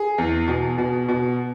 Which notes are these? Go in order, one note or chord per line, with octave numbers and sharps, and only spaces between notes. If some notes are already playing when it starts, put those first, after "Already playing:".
Already playing: G#4
E2
B2
B2
B2